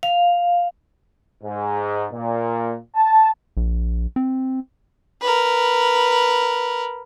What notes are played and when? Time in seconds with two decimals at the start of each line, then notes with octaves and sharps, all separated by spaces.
0.03 F5
1.44 G#2
2.13 A#2
2.95 A5
3.57 A#1
4.16 C4
5.21 A#4 B4